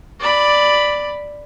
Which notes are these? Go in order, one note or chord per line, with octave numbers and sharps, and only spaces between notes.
D5 B5